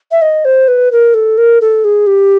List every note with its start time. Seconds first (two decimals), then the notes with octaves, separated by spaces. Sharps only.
0.12 E5
0.22 D#5
0.45 C5
0.68 B4
0.92 A#4
1.14 A4
1.38 A#4
1.61 A4
1.84 G#4
2.07 G4